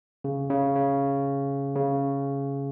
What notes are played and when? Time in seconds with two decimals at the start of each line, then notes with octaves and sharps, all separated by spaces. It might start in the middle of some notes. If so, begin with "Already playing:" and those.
0.24 C#3
0.50 C#3
0.76 C#3
1.75 C#3